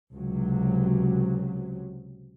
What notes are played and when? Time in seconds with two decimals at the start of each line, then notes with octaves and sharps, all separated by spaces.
0.12 C#2 C3 F#3